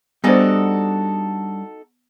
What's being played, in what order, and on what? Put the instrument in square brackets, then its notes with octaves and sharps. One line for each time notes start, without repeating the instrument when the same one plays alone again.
[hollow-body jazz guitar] G3 D4 [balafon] B3 C5 [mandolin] D#4 F#4 A4